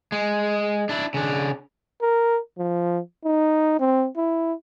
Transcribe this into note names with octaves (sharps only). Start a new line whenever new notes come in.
G#3
D4 E4
C#3 D4
A#4
F3
D#4
C4
E4